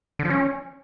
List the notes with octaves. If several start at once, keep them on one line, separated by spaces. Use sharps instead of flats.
D3
F3
C#4